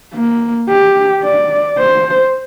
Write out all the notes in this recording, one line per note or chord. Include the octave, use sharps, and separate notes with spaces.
A#3
G4
D5
C5